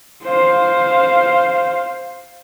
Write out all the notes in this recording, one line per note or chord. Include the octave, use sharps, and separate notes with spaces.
C5 F5